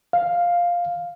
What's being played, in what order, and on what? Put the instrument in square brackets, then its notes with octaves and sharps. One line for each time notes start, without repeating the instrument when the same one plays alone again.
[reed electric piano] F5